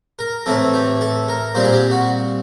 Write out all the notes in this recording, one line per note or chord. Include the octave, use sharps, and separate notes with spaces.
A#4
A2 E3 A3 C4 A4
G4
A4
A#4
A#2 G3 C4 C5
G#4
G4
F#4